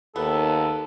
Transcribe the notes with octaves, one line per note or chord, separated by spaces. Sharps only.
D#2 B3 A4